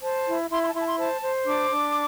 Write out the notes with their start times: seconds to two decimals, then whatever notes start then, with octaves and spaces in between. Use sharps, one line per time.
0.02 C5 A5
0.26 E4
0.50 E4 C6
0.62 C6
0.68 A5
0.74 E4 C6
0.80 A5
0.86 C6
0.97 C5 A5
1.22 C5
1.46 D4 D6
1.70 D4